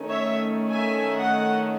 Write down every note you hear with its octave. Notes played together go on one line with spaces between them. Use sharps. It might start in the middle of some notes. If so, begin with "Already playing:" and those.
Already playing: D#3 A3 C#4
C#5 E5
E5 G#5
D#5 F#5